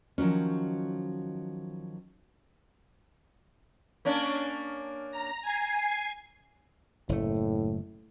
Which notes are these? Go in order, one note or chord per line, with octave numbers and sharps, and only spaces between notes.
D#3 F3 F#3 C#4
A#3 C#4 D4
A#5
G#5 G#6 C7
F#1 A2 A3